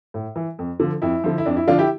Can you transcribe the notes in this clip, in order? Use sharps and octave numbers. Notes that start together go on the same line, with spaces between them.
A2
E3
F2
D3 F3
F2 E4
D3 F3
E4
F2 D4
E4
D3 F3 D4 F4
E4 G4